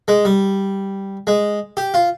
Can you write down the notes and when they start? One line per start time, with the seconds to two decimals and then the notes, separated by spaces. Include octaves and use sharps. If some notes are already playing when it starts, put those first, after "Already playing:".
0.08 G#3
0.25 G3
1.27 G#3
1.77 G4
1.94 F4